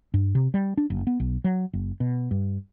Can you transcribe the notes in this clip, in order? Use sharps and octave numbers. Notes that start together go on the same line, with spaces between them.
G2
C3
G3
D4
F#1
B3
B1
F#3
F#1
B2
G2